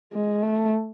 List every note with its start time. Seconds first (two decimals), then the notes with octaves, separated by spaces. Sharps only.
0.13 G#3
0.42 A3